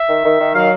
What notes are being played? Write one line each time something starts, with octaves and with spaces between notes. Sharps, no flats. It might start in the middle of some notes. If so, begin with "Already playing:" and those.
Already playing: E5
D#3
D#3
D#3
F#3 F5